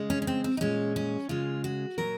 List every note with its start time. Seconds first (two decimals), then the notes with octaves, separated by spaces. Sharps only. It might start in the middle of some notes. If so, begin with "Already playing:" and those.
Already playing: C#3 G#3
0.10 C#4
0.22 C#4
0.27 C4
0.44 C4
0.57 D#4
0.61 A#2 G#3 C#4
0.96 C#4
1.29 C#3 G#3 F4
1.64 F#4
1.98 A#2 F#3 A#4